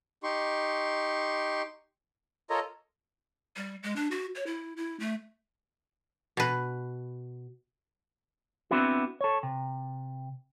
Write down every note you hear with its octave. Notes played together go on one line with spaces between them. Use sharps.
D#4 G4 C6 C#6
F4 A4 A#4 C#5 D#5 A#5
G3
G#3
D4
F#4
C#5
E4
E4
A3
B2 B4
B3 C4 D4 E4 F#4
A4 C#5
C3